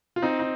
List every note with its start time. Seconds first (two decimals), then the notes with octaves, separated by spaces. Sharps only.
0.16 F4
0.22 C4 D#4
0.39 D#4